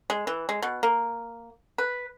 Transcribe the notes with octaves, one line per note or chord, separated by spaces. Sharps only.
G#3
E3
G#3
B2
A#3
B4